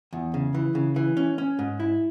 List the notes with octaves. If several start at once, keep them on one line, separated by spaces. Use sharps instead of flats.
E2
C#3
E3
C#3
E3
C#4
C#4
G#2
E4